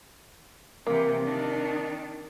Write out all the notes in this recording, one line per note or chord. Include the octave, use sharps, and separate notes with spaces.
C3 E3 A#3
D#3 D4